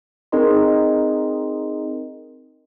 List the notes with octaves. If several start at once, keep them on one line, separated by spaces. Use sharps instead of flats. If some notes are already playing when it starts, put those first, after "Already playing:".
C4 D#4 G#4 A#4 D#5 C6